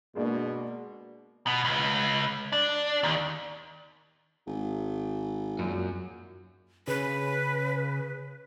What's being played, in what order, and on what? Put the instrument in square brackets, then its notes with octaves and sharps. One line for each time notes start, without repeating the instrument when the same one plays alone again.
[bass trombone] B2 [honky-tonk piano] G#3 A#3 D4
[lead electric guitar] B2
C#2
D4
D#2
[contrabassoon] G#1
[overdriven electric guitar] F#2 [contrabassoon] A#2
[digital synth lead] C#3 [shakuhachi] B4